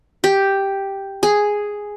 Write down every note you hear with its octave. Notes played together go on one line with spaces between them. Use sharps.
G4
G#4